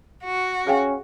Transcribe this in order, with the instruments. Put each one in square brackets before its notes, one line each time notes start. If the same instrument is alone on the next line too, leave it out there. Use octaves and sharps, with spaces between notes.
[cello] F#4
[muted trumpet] C#4 [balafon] G#4 F5 G5